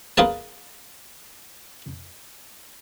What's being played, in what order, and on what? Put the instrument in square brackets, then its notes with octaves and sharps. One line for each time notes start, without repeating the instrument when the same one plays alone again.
[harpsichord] A#3 F4 G#4 B4 A5